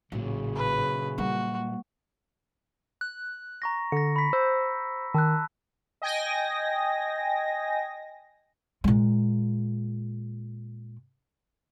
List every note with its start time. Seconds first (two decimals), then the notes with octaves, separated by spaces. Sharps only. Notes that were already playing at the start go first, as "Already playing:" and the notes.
0.12 A1 A#2 C#3 F#3
0.55 B4
1.18 G3 A#3 F#4
3.01 F#6
3.62 A#5 C#6 A#6
3.92 D3 A#6 C#7
4.16 B5 B6
4.33 C5 E6
5.14 D#3 A5 E6 F#6
6.02 D#5 G5 G#5 A#6
8.84 A#2 G#3